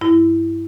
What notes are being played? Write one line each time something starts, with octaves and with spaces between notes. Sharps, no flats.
G2 E4